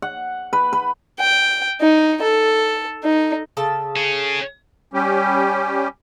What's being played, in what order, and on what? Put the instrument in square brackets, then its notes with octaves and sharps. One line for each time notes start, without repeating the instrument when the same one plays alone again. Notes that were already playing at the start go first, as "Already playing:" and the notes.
[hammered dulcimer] F#5
B4
B4
[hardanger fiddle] G5
D#4
A4
D#4
[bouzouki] C#3 A4 A5
[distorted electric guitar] G#4 C#5
[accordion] G3 C#4 G4